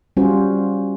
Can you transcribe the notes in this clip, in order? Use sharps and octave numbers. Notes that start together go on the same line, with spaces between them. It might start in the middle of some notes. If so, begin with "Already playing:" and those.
G3 C#4 F4 F#4 C5